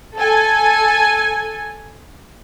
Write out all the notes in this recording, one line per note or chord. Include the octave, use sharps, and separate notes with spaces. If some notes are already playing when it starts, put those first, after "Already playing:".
A4 G#5